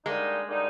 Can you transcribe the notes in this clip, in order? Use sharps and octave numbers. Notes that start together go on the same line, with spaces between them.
D3 G3 G#3 A#3 D#4
D3 G3 A#3 D#4